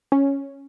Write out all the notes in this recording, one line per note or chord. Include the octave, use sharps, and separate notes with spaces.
C#4